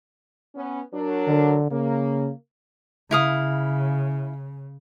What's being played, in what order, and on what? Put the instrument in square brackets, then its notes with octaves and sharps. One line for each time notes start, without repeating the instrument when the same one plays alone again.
[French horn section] B3 C#4
F#3 D4 A#4
[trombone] D3
[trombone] C#3 [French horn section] A#3
[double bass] C#3 [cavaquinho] E4 F5 D#6